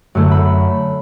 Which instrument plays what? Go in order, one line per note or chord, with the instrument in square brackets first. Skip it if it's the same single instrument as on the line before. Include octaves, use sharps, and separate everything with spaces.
[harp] F#2 D3 A3
B5